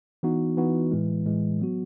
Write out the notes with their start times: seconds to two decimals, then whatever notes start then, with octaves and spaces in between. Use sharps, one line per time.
0.23 E3 B3 D#4 F#4
0.57 E3 B3 D#4 F#4
0.91 A2 E3 G#3
1.26 A2 E3 G#3
1.60 F#3 B3 F#4